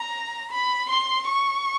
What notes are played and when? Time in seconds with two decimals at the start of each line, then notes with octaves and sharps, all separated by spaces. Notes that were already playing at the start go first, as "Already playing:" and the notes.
Already playing: A#5
0.52 B5
0.90 C6
1.27 C#6